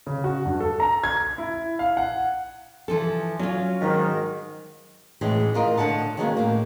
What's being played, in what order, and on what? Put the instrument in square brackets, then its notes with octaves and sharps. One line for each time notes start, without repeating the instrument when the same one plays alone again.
[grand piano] C#3
F#4
G2
A4
A#5
G#6
E4
F5
F#5
[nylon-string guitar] E3 F3 A4
[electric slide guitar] F#3 [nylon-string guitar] C#4 F4
[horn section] G#2 D#3
[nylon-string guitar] A2 E3 G#3 C#4
G#2 F4 A#4 D#5
A2 D3 F#5 A5
D#3 E3 F#3 G#3 A#3 C#4
A2 A#3